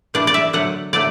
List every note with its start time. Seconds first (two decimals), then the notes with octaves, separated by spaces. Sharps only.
0.14 E3 B3 D4 D5
0.27 D5
0.34 E5
0.53 D3 F#3 A3 F#5
0.93 D3 F#3 A3 D5